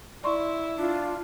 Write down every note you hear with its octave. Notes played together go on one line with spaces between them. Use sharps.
E4 D5 C6 C#6
D4 F4